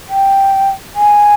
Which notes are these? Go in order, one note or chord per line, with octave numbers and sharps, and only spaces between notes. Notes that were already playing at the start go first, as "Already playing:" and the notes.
G5
G#5